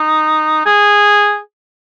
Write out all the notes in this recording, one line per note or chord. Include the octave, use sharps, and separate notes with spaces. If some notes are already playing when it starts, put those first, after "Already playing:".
Already playing: D#4
G#4